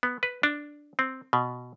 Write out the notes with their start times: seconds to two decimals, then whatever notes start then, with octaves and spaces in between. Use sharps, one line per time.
0.03 B3
0.23 B4
0.43 D4
0.99 C4
1.33 B2